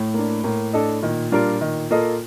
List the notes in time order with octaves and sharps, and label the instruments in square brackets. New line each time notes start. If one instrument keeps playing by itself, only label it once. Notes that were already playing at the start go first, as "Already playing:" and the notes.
Already playing: [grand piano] A2
[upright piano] A#3 D4
[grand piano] A2 [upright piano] A#3
[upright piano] D4 A4 D#5
[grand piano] A#2 [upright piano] D#3
[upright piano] G3 D4 F4 A#4
D#3
A#3 F4 A4 D#5